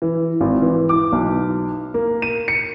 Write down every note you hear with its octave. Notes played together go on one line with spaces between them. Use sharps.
E3
G#1
E3
D6
B1
A#3
D#7
C#7